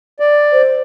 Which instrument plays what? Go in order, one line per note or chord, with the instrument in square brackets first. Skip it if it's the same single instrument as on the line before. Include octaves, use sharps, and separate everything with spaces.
[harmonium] D5
[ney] C5